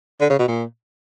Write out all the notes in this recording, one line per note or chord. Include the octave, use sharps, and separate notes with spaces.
D3
C#3
B2
A#2